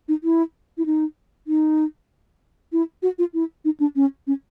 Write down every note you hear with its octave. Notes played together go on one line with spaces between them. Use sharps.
D#4
E4
E4
D#4
D#4
E4
F#4
F4
E4
D#4
D4
C#4
C#4